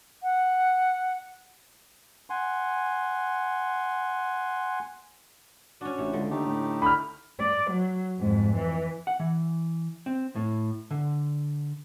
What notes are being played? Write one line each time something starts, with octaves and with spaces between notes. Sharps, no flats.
F#5
F#5 G#5 C6
C#4 D4 F#4
A1 C3
C#2 D3
D#2 A3 D#4 G4
A2
D3 B5 F6
D5
F#3
F2 G#2
E3
F#5
E3
C4
A2
D3